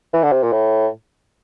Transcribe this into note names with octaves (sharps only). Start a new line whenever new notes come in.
E3
D3
C3
A#2
A2